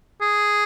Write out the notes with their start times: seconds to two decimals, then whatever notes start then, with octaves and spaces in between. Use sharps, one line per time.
0.21 G#4